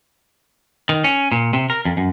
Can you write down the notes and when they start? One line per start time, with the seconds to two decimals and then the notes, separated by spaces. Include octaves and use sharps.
0.89 D#3
1.04 C#4
1.32 A#2
1.53 C3
1.70 A#4
1.85 F2
1.97 F#2